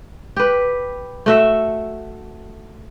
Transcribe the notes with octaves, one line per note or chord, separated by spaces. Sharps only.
G4 B4
A3 F#4 E5